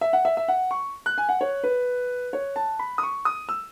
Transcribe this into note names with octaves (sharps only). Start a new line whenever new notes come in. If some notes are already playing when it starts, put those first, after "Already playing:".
E5
F#5
E5
E5
F#5
C#6
F#6
G#5
F#5
C#5
B4
C#5
A5
B5
D#6
C#6
D#6
E6